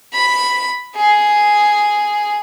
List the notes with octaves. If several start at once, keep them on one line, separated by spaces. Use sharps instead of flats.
B5
G#4